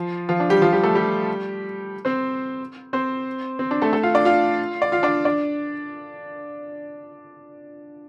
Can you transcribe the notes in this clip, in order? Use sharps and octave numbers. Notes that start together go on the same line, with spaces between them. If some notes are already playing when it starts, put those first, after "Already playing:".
Already playing: F3 F4
F3 F4
D4
G3 G4
F3 F4
G3 G4
A3 A4
G3 G4
C4 C5
C4 C5
C4
D4
A3 A4
A3 A4
F4 F5
D4 D5
F4 F5
D5
F4 F5
D4 D5
D4 D5